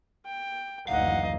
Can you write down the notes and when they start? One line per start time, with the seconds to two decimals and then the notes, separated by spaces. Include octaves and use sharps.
0.26 G5
0.88 F#1 D2 E3 D#4 D#5 F5 F#5